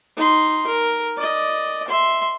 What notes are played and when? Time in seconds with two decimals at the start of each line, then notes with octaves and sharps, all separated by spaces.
0.17 D#4 C6
0.67 A#4
1.17 D5 D#5
1.88 E5 C6